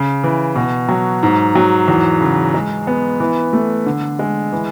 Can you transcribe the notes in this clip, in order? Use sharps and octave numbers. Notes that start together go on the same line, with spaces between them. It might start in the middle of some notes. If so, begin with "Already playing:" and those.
Already playing: C#3
E3
B2
F#3
G#2
F#3
E2
C#3
G#3
B3
E3
A3
D3
G#3
E3